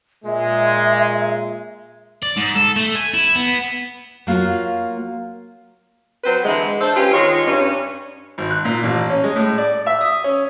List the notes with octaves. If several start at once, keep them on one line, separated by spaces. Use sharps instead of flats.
A#2 G#3 E5
D5
G#2
A4
A3
G#5
E4
B3
F#3 A#3 F4 F#4 F5
F#3 C4 B4 C5
D3 E3 G#3
D4 A4 C5
C#4 F4 G4 B4
D#3 G#3 F4 C#5
G2 C#4
G#1
F#6
A#2
A1
C#4
G#3
A2
D5
E5
D#6
C#4